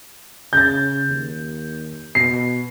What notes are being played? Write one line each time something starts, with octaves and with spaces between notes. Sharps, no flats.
C#3 G6 A6
D#2
B2 C7